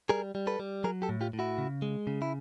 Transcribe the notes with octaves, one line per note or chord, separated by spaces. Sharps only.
G3 G#4 A#4
G3
A4 B4
G3
F#3 G#4 A#4
G4 A4
A2
F4 G4
A2
E4 F#4
C#3
G#3
C#3
E4